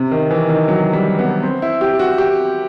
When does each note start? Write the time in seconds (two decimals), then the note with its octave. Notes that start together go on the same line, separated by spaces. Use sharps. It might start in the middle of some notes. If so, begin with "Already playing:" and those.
Already playing: C3
0.11 D#3
0.31 E3
0.49 D#3
0.68 F#3
0.93 G3
1.19 B3
1.43 C4
1.62 E4
1.81 G4
1.99 F#4
2.18 G4